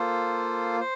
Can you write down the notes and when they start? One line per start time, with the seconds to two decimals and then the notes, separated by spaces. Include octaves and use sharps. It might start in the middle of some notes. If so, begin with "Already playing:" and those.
Already playing: A#3 F4 A4 C5
0.80 C5